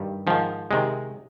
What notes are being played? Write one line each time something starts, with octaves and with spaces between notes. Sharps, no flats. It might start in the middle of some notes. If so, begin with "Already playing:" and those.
Already playing: G2 D#3 G3
G#2 D#3 F3
C3 D#3 G#3